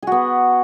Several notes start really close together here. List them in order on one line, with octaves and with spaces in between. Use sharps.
G#4 F#4 B3